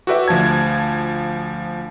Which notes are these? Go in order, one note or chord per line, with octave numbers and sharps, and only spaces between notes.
F#4 G4 A4 B4 D5 E5
D2 F3 A5 G#6